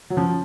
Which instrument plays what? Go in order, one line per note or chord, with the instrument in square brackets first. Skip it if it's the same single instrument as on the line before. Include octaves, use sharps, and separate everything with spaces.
[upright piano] F#3
[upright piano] F3 [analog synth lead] C#4